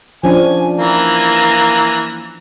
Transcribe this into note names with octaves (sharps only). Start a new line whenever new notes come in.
F3 C#4 D4 G#5
E3 A#3